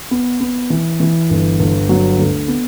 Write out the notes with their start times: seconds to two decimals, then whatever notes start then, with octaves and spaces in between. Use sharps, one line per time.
0.11 B3
0.40 B3
0.70 E3
1.00 E3
1.30 G1
1.60 G1
1.89 F#3
2.19 D2
2.48 B3